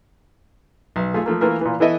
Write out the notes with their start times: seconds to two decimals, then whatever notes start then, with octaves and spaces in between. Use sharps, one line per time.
0.96 B1
1.14 A3 F4 G#4
1.26 F3 A3 A#3
1.41 E3 A3 A#3 F4 A#4 B4
1.61 A#2 E3
1.80 E3 B3 E4 A4 D#5 E5